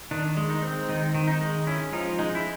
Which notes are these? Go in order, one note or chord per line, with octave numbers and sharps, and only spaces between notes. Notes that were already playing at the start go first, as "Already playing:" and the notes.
D#3 D4
G#3
D#4
C4
D#3 D#4
D#3
D#4
G#3
C#4 E4
F3 D#4
G#3 D#4
E4